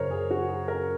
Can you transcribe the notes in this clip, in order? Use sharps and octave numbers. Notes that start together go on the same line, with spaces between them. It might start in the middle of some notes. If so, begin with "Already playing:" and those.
Already playing: F#2 C#3 F#3 A#4 C5 C#5
G#4
F#4
G#4
A#4